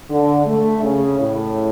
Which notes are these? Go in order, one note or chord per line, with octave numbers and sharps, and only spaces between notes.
D3
A3
C#3
A2